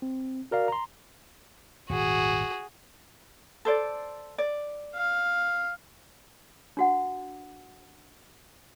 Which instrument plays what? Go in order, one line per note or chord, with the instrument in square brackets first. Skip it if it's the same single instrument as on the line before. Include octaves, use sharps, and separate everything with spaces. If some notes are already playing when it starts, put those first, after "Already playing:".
[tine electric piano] C4
F#4 A#4 D5 F5
A#5 C6
[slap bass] D#1 G#1 [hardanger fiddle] F#4 G#4
[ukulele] A4 C5 D5
D5
[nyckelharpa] F5
[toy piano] D4 F#4 F#5